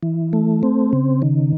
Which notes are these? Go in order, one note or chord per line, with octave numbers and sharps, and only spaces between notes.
E3
A3
C4
C#3
D#3